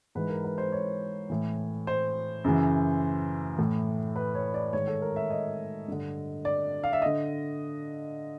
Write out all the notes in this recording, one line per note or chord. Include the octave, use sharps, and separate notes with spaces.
G#2 E3 B4
A#4
B4
C5
C#5
A2 E3
C5
F#2 C#3 E3
A2 E3
B4
C#5
D5
G#2 D#3 C#5
A4
A#4
E5
D#5
G2 D3
D5
F5
E5
D3 D#5